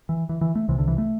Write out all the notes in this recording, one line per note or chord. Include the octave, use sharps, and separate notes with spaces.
E3
E3
E3
A3
C2 C3 E3
D3
E3
A3